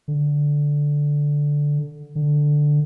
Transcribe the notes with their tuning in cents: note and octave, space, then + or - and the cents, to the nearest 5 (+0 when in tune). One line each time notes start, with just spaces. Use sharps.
D3 -5
D3 +5